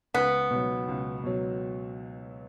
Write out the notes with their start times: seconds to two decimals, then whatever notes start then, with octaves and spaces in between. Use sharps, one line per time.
0.14 C#2 B3
0.51 B2 F#3
0.88 C#2
1.24 B2 F#3